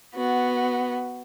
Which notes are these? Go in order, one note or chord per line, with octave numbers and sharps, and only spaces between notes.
B3 F#4